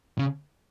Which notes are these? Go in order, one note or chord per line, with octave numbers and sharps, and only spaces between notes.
C#3